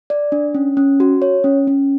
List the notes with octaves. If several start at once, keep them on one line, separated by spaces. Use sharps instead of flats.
D5
D4
C#4
C#4
F#4
C#5
C#4
C#4